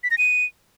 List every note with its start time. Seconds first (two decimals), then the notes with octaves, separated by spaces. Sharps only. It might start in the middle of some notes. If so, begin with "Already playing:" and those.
0.04 B6
0.11 A#6
0.18 D#7